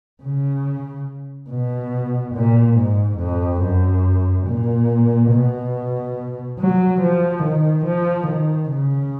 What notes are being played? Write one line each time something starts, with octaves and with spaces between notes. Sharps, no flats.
C#3
B2
A#2
G#2
F2
F#2
A#2
B2
F#3
F3
D#3
F3
D#3
C#3